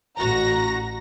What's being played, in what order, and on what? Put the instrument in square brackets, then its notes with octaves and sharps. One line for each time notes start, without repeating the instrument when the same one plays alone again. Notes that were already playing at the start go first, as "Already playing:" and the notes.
[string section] A1 F#4 A#5 A#6